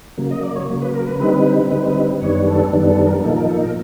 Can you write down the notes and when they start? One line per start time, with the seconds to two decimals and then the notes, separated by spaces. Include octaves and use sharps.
0.18 C#3 F#3 A#3
0.31 D#5
0.43 D5
0.56 C#5
0.69 C#3 F#3 A#3
0.82 B4
0.94 A#4
1.07 B4
1.19 D3 G3 C4 D#4 B4
1.71 D3 G3 C4 D#4 B4
2.22 F#2 D#3 G3 B3 D4 C#5
2.47 A4
2.73 F#2 D#3 G3 B3 D4
2.90 A4
3.07 A#4
3.24 A#2 F3 A#3 D#4 A4
3.36 A#4
3.49 A4
3.62 A#4